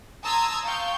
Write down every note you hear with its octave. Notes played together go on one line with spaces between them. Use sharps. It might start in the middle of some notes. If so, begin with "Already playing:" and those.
A5 A#5 C6 D#6 E6 G#6
F5 G5 C#6 G6